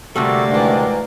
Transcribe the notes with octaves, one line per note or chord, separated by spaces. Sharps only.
D2 C3 G3 A3 A#3 F#4 A4 D5
G#2 D#3 E3 D4